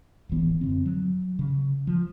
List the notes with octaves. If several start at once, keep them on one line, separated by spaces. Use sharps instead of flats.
D1 G#1 E3 B3
F#2 D3 C4
F#3
C#3
F3